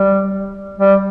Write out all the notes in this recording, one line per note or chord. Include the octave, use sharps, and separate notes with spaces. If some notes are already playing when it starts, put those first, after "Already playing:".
Already playing: G3
G3